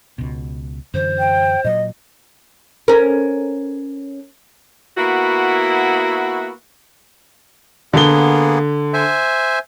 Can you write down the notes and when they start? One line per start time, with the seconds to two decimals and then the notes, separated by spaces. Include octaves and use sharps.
0.18 C#2 B2
0.94 F#2 D3 E3 C5
1.19 G5
1.64 A#2 F#3 D#5
2.88 C#4 A#4
4.97 A#3 B3 E4 F#4
7.93 D3 A#3 B3 G#4 G7
8.94 C5 E5 G#5